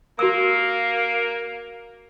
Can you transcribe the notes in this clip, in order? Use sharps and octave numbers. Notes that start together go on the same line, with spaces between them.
A#3 F#4 E6